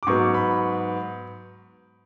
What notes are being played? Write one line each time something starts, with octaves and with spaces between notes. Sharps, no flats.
D6
G#2 F#3 B3 C#6
B5